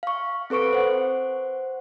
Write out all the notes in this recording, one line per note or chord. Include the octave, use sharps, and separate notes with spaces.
F5 C#6
C4 A4 B4 C#6 D7
C5 F#5